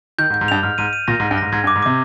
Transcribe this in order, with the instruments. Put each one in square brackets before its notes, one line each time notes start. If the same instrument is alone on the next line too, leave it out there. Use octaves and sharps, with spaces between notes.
[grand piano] D#3 [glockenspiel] G6
[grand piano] G#2
[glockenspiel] G6
[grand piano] G#2
[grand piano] G2 [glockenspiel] F7
[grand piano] G#2 [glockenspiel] F6
[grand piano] G#2 [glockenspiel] D#7
[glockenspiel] D#7
[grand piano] A#2 [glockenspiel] A#6
[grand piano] G#2
[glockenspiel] A#6
[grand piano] G2
[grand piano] G#2 [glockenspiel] A#6
[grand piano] G#2 [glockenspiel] G#6
[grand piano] G2
[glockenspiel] D6
[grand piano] G#2
[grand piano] C3 [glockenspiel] D6